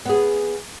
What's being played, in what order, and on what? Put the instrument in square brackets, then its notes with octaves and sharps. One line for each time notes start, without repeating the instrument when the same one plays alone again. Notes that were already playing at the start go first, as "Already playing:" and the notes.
[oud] B3 G#4